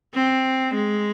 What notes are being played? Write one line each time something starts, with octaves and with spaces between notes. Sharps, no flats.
C4
G#3